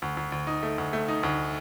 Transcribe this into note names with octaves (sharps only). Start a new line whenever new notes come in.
D2
D2
D2
D#4
A3
D2
A3
D#4
D2